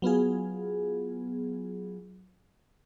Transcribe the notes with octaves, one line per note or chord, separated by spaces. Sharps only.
F#3 B3 F4 G#4